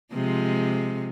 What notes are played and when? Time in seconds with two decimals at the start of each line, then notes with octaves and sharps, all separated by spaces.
0.13 C3 F3 G#3